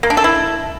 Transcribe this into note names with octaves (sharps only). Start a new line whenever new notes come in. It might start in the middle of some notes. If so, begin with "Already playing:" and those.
A#3
D4
A4
E4